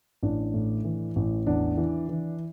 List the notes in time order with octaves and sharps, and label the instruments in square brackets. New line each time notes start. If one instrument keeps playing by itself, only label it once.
[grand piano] A1 D4
A2
E3
A1
E2 D4
E3
E3